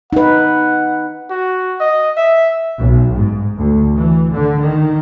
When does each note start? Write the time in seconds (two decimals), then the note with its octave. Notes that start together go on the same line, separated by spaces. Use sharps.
0.13 D#4 B4 F#5
1.30 F#4
1.80 D#5
2.17 E5
2.79 B1
3.16 G#2
3.58 D2
3.95 E3
4.33 D3
4.63 D#3